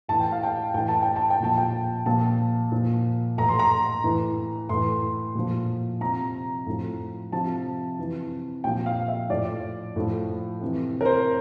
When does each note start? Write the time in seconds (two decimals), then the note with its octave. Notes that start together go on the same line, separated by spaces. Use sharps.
0.08 A2 E3 A5
0.20 G5
0.32 F5
0.43 G5
0.74 A2 E3 G5
0.88 A5
1.02 G5
1.16 A5
1.30 G5
1.40 A#2 F3 A5
1.58 G5
2.06 A#2 F3 A5
2.72 A#2 F3
3.38 A2 E3 A#5
3.49 C6
3.59 A#5
4.04 A2 E3
4.69 A2 E3 C6
5.35 A#2 F3
6.01 C3 F3 A#5
6.66 A2 F3
7.32 C3 F3 A5
7.98 C3 E3
8.64 A#2 F3 G5
8.86 F5
9.08 E5
9.30 A2 F3 D5
9.96 A2 F3
10.61 C3 E3
11.01 A#4
11.05 C5